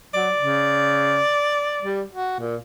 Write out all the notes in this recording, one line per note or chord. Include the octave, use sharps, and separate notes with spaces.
F#3 D5
C#3
G3
F#4
A#2